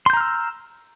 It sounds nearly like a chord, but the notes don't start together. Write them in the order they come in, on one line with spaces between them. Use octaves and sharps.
C6 G6 A#5 F6 E6